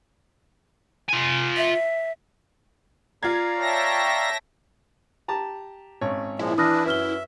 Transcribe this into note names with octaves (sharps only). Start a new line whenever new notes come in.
F4 G#5
E5
F4 D5 F5 A#5 G#6
C#5 E5 G5 A5 A#6
G4 A5 A#5
G#1 C#4 C#5
A#2 F3 G#3 E4
E3 D4 B4 D#6 F6 A#6
F#2 B4 E5 F6 G7